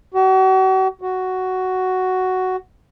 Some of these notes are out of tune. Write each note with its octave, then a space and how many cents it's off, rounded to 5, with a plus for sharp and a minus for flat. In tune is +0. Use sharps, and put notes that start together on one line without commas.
F#4 +40
F#4 +5